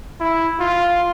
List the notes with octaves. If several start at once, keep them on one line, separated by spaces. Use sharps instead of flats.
E4
F4